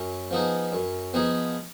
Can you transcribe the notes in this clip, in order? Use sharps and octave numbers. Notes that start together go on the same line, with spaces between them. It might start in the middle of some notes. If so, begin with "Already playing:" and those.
Already playing: F#2
F3 B3 D#4 G#4
F#2
F3 B3 D#4 G#4